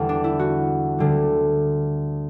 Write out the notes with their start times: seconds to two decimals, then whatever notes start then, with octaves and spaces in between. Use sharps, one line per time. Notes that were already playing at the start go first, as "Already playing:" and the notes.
Already playing: E2 D3 G3
0.09 D4
0.24 E4
0.39 F#4
0.98 D2 D3 G3